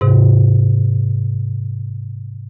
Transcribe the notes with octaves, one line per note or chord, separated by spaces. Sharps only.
G#2 C3